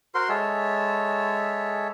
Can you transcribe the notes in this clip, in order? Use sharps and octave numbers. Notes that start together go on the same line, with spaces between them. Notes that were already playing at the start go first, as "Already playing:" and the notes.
F#4 A#4 C5 C6
G#3 A4 C#5 E5